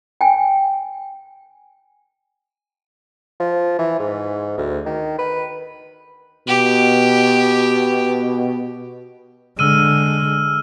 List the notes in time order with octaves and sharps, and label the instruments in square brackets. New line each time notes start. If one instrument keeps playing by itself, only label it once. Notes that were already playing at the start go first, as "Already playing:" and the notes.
[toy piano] G5 G#5
[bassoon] F3
E3
G#2
D2
D#3
B4
[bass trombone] B2 [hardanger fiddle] G4
[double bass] D3 G#3 [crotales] E6 F6 D#7